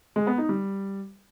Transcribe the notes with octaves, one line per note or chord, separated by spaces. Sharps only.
G#3
B3
D#4
G3